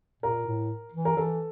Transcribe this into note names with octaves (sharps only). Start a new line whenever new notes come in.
A#2 A#4
A2
E3
A#4
E3 A4